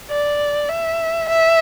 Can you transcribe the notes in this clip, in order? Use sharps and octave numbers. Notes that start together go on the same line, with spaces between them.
D5
E5
E5